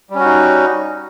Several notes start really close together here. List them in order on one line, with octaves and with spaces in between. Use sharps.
G3 C#4 F#4 D#4